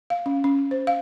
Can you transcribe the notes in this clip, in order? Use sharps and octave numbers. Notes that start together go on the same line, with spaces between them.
F5
C#4
C#4
C5
F5